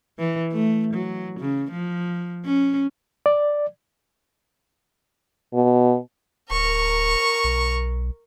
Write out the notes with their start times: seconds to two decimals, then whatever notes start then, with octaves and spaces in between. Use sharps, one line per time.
0.19 E3
0.52 A3
0.94 F#3
1.39 C#3
1.71 F3
2.45 C#4
3.26 D5
5.54 B2
6.50 D1 A#4 C#6
7.44 B1